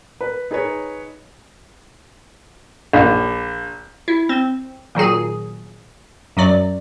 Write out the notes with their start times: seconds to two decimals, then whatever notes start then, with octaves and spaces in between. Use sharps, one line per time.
0.21 B4
0.51 D#4 G#4 B4 C#5
2.93 A#1
4.08 E4
4.29 C4
4.95 A#2 D#3 F#3 G#4
6.37 F#2 F#3 D5